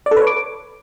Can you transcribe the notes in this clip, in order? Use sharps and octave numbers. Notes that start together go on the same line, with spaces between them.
D5
A4
B4
C#5
D6